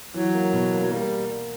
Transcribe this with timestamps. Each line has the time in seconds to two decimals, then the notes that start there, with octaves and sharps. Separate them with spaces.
0.14 E3 F#3
0.34 A#3
0.53 B2
0.72 A#3
0.90 G3 A#3